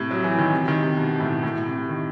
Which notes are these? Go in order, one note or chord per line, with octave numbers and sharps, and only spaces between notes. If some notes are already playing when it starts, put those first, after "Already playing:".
Already playing: A2 C3
F#3
E3
D#3
C3
D#3
C3
B2
A2
A2
C3
D#3